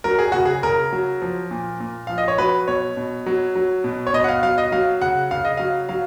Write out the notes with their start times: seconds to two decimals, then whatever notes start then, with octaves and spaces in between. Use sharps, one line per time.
0.04 F#3 A#4
0.19 G#4
0.32 C#3 F#4
0.45 G#4
0.63 C#3 A#4
0.92 F#3
1.22 F3
1.51 A#2
1.80 A#2
2.07 F3 F5
2.18 D#5
2.28 C#5
2.38 F#3 B4
2.68 B2 C#5
2.97 B2
3.26 F#3
3.56 F#3
3.84 B2
4.07 C#5
4.13 B2 D#5
4.24 F#5
4.28 F5
4.43 F#3 F5
4.58 D#5
4.72 F#3 F5
5.01 C#3 F#5
5.31 C#3 F5
5.45 D#5
5.57 F#3 F5
5.89 F#3 F5